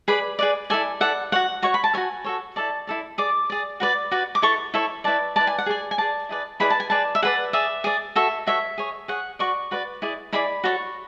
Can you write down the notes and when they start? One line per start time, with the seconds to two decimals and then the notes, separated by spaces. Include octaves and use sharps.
0.08 G#4 B4 D5 B5
0.39 G#4 B4 D5
0.70 E4 A4 D5 G#5
1.00 E4 A4 D5 F#5
1.32 F#4 C#5 F#5
1.62 F#4 C#5 C#6
1.74 B5
1.84 A5
1.94 F#4 A4 C#5 G#5
2.24 F#4 A4 C#5
2.56 E4 A4 D5 A5
2.87 E4 A4 D5
3.18 G#4 D5 D6
3.50 G#4 D5
3.80 F#4 B4 D5
4.11 F#4 B4 D5
4.35 D6
4.42 E4 A4 C#5 C#6
4.74 E4 A4 C#5
5.04 E4 B4 D5 A5
5.36 E4 B4 D5 A5
5.47 G#5
5.58 F#5
5.66 G#4 D5 G#5
5.91 G#5
5.98 G#4 D5 A5
6.29 E4 G#4 B4 D5
6.60 E4 G#4 B4 D5 B5
6.70 A5
6.80 G#5
6.90 G#4 B4 D5 A5
7.15 E5
7.22 G#4 B4 D5 F#5
7.53 G#4 D5 E5
7.84 G#4 D5
8.15 F#4 A4 C#5 E5
8.47 F#4 A4 C#5 E5
8.78 G#4 C#5
9.08 G#4 C#5 F#5
9.39 F#4 B4 D5 C#6
9.71 F#4 B4 D5
10.02 E4 G#4 D5
10.33 E4 G#4 D5 B5
10.64 F#4 A4 C#5 C#6